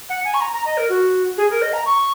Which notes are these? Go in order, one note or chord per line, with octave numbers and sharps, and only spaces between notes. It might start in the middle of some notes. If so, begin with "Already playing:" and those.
F#5
G#5
C#6
A#5
A#5
D#5
A#4
F#4
G#4
A#4
D#5
A#5
C#6